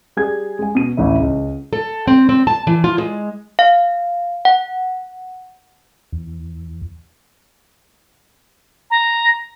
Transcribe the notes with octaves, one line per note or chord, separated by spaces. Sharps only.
G3 G#4 G#6
G#3 G#5
B2 D#7
A1 D2 E4
C#2
A4
C4
C4
A5
E3
F4
G#3
F5
F#5
E2
A#5